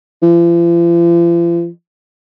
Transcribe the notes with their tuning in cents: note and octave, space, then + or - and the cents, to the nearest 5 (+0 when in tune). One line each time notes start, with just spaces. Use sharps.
F3 -45